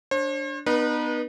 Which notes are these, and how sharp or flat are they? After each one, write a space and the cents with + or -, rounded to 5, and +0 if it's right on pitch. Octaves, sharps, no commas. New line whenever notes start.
D4 -5 C5 +45
B3 +0 D#4 -35 B4 -35